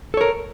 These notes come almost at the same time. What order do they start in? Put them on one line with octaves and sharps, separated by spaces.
A4 C#5 A#4